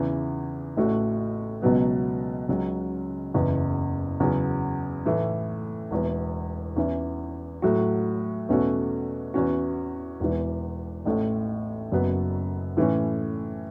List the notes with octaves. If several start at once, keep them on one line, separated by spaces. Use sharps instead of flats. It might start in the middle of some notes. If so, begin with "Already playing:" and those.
Already playing: E2 C#3 E3
A1 A2 A3 F#4
C#2 B2 F#3 B3
C#2 C#3 F#3 C#4
F#1 E2 C#3 E3 B3
E2 C#3 F#3 C#4
A2 E3 A3
E1 E2 E3
E2 E3 C#4 E4
A2 F#3 A3 F#4
E2 B2 A3 C#4 F#4
E2 E3 C#4 F#4
E1 E2 E3
A1 A2 A3
F#1 F#2 F#3 B3
A2 E3 A3 C#4